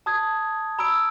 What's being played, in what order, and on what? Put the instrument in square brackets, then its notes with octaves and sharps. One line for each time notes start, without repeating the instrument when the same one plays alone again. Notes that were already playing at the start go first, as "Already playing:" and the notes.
[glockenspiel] A5 D#6 G#6
A#5 B5 E6 D7